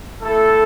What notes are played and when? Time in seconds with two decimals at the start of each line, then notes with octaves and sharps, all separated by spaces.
0.21 A3 E4 A4